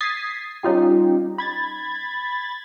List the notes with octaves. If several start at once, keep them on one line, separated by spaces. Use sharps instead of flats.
D#6 G#6 A6 B6 C7
G3 C#4 D#4 F4 G4
B5 G#6 A6